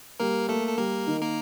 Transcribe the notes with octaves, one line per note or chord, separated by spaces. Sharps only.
G3 A#3 A#4
A3 A#3 A4
A4
G3 A#3 A#4
D#3
A#3 A#4